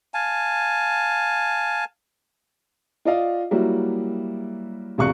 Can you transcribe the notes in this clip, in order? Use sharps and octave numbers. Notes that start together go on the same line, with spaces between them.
F5 G#5 A5
F4 D5 D#5 F5
F#3 G3 A#3 E4 F#4
E1 C2 F5 C#6 F#6 C#7